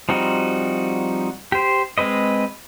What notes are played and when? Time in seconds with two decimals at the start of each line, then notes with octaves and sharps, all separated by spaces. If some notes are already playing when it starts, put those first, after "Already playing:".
0.09 F3 G3 C4 D#4 F#4
1.52 G4 C5
1.98 G#3 C4 B4 D#5